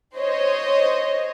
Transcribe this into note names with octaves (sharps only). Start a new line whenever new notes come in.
C5 C#5 D#5